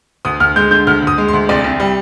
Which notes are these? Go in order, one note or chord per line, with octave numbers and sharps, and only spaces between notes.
D2 D#6
D2 F6
G#3 G6
D3 G6
D2 F6
D2 D#6
G#3
C6
D2
C2 D5
C2
G3